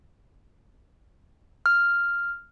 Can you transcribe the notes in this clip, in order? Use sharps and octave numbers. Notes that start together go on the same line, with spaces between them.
F6